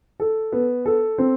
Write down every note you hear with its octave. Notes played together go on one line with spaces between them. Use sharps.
A4
B3
A4
C4